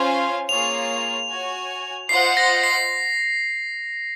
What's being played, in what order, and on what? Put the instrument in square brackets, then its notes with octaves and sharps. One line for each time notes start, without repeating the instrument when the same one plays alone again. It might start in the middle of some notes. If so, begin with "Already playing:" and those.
Already playing: [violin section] C#4 F4 C5 F5 G#5
[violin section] A#3 F4 G#4 C#5 [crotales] F7
[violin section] F#4 C#5 G#5
[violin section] F4 C5 D#5 F#5 [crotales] C7
[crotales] A#6
C7